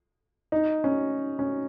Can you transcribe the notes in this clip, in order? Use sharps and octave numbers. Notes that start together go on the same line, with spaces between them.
D#4
C#4
C#4